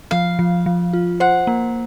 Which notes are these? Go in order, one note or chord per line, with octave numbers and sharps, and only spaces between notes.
F3 F5
F3
F3
F4
C5 F#5
A#3